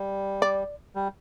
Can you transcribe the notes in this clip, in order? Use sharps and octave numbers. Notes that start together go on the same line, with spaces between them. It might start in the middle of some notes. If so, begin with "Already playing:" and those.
Already playing: G3
D5
G3